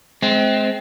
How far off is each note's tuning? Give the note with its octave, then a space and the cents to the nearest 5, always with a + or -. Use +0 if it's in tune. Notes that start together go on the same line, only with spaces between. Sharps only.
G#3 +35 C4 +0